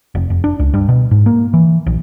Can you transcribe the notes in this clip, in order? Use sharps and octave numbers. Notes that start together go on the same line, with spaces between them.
F1
F1
D4
C#2
G2
B2
G#2
A#3
E3
A#1